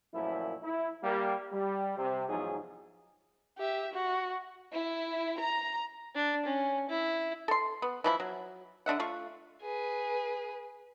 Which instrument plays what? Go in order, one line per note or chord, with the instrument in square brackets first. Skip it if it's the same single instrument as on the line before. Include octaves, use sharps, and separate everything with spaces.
[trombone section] F#2 A#2 F3 A3 E4
E4
G3 A#3
G3
C3
E2 G#2 F3 F#3 D#4 G#4
[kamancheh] G4 E5
F#4
[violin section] E4
A#5
[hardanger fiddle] D4
C#4
E4
[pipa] A4 C6
B3
E3 F3 E4
F#3
D3 D4 E5 F#5
A3 F4 C#6
[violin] G#4 B4